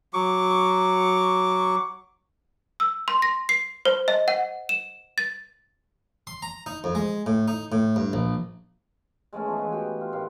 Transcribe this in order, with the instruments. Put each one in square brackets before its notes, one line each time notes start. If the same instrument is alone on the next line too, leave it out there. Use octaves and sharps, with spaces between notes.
[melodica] F#3 C#6 D6
[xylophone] E6
C6
A#6
C7
C5
D#5
F#5
E7
A6
[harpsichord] C6
A#5
D#4
F2
G#3
A2
D#4
A2
G2
A#1
[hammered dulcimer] G#3 A3 B3 C#4
F3 E4 G#4
E3 B4
F#4 G4
F4
A2 D#3 E4 F5